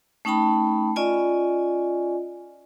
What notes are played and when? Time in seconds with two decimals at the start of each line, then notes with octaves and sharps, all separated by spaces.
0.25 A3 C#4 D#4 G5 A5 B5
0.96 C#4 F4 D5 D#5 G#5